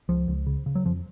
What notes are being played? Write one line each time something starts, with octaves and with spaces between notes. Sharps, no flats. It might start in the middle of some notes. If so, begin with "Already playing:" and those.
C#2 F3
C#2
C#3
C#3
F#3
F2 F3